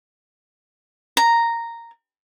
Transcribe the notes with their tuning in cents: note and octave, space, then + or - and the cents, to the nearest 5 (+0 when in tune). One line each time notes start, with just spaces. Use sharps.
A#5 -5